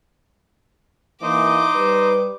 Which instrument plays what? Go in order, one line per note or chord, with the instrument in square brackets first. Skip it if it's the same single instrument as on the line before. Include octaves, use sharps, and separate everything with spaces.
[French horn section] E3 A#3 [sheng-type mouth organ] D#4 C5 D#5 [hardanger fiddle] D6
[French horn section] G3 B4